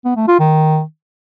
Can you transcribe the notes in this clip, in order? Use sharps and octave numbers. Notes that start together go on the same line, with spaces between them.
B3
A3
F4
D#3